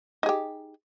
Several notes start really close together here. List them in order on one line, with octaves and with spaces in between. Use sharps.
D#4 G#4 G4